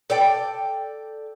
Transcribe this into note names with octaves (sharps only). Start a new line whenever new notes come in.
A4 D5 G5